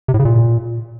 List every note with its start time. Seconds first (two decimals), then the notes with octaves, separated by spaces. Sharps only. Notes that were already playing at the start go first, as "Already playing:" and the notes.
0.08 C3
0.14 A2
0.19 C#3
0.25 A#2